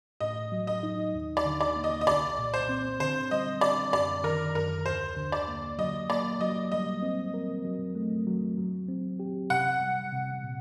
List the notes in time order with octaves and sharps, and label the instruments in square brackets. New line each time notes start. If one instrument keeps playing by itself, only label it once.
[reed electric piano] A2 [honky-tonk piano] D#5
[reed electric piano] F#3
[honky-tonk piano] D#5
[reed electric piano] D#4
D#2
[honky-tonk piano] D5
[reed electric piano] D3
[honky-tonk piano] D5
[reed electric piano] A#3
[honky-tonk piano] D#5
D#5
[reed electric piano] C2 [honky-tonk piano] D5
[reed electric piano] A#2
[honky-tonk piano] C5
[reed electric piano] C4
[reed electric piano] D3 [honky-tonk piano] C5
[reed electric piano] G3 [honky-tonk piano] D#5
[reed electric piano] D3 [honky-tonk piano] D5
[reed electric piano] F#2 [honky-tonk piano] D5
[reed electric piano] D#3 [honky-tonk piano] A#4
[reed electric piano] F#2 [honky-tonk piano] A#4
[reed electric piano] D#2 [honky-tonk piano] C5
[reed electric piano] D3
[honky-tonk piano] D5
[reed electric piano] A#3
[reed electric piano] F#3 [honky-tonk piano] D#5
[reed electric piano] A#3 [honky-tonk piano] D5
[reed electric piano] F#3 [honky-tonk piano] D#5
[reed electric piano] G3 [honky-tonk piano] D#5
[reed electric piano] C4
A#4
F#3
A3
F#3
F#3
C4
G4
[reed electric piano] C3 [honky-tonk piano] F#5
[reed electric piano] G3
C3
A#2